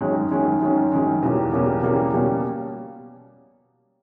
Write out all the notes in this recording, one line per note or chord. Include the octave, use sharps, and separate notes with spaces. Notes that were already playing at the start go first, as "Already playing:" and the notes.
F#2 D#3 G#3 C#4
F#2 D#3 G#3 C#4
F#2 D#3 G#3 C#4
F#2 D#3 G#3 C#4
E2 B2 G3 A#3 C#4
E2 B2 G3 A#3 C#4
E2 B2 G3 A#3 C#4
B2 G3 A#3 C#4